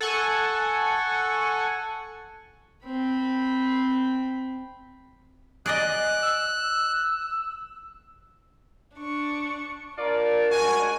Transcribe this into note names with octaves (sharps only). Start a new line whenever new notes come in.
A4 F#5 G#5 C#6
C4 B5
G#4 D5 D#5 F#6
E6
D4 C#6
D4 F4 A#4 D5
G#2 F#4 G#5